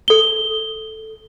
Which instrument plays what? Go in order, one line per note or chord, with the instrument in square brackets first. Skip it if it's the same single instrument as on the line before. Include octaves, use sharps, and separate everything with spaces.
[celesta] A4 G7